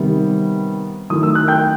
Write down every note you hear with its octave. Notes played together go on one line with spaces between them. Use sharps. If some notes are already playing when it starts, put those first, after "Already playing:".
Already playing: C3 D#3 G3 B3
D#3 F#3 A3 E4 D#6
E6
F#6
G5 G6